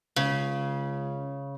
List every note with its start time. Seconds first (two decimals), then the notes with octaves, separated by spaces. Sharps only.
0.16 C#2 C#3